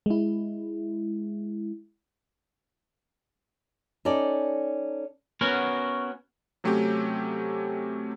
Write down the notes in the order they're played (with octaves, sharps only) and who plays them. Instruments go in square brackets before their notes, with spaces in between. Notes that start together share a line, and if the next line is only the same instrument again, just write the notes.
[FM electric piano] G#3 E4
[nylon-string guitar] C#4 D#4 A4 D5
[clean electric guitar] B3 C#4 F#4 A#4
[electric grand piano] C3 F#3 A3 C4 C#4 G4